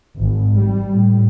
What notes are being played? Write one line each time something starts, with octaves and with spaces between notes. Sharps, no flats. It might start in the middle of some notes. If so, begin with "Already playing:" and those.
G#1
G3
A2